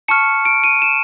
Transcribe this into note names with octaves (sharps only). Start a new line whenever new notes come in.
A5 C#6 F6 C#7
D7
D#7
E7